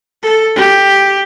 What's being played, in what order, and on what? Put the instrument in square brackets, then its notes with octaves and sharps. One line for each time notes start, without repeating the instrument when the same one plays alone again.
[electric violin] A4
G4